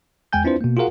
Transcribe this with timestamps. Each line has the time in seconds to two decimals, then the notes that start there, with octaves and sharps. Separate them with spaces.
0.33 E2 G#3 G5 G#5 G6
0.44 C4 D4 E4 F4 B4 C5
0.61 B2 A#3
0.77 F4 F#4 G#4 A#4 F5 F#5